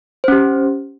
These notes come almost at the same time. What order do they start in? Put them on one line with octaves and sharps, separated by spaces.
C5 C#4 G4